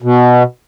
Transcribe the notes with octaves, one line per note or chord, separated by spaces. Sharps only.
B2